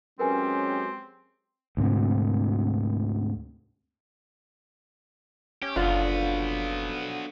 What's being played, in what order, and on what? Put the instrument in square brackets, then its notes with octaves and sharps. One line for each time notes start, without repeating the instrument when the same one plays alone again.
[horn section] F#3 G#3 G4 [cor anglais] C4 [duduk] C#4 [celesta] A#4 B4 G#5
[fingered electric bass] D2 G#2 C3 C4
[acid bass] C#4 [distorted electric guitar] G4
[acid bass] F#1 [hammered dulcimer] D3 F3 [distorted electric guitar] F#3 B3 [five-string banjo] F4